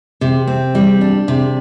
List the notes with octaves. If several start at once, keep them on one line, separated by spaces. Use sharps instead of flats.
C3
C4
G3
D4
C3